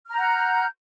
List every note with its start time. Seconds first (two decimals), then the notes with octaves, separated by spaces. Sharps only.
0.06 F6
0.11 A#5
0.15 G6
0.19 F#5